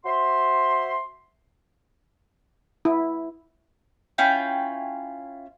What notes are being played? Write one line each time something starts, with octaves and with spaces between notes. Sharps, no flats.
F#4 C5 E5 C6
E4
C#4 E4 F4 G5